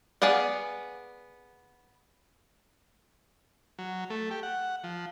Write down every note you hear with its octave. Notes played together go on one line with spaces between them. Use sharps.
B3 G#4 D5 F5 F#5
F#3
A3
G4
F#5
F3